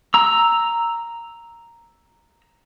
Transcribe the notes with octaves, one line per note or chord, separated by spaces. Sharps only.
A#5 E6